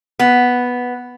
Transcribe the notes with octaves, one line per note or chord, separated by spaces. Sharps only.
B3